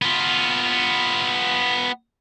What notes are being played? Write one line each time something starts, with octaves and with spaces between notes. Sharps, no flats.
B3 F4